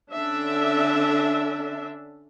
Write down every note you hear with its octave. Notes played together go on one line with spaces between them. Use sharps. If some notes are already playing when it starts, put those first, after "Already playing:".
D3 C#4 D4 E5